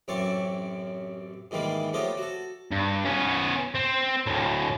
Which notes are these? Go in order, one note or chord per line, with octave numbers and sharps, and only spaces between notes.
A1 F#2 C4 C#5 D5 C#6
G#2 D#3 E3 G3 A#3
F3 A3 B3 G4 C#5 D#5
F#4 A4
G2
B3 C#4
C4
D2 A2